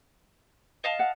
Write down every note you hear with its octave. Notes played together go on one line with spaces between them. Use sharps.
D#5 F5 A5
F#5